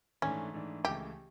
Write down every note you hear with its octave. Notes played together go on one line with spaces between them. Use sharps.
G#2 E3 A3 C#4 D4
G#2 E3 A3 D4
C#2 C#3 E3 A3 G4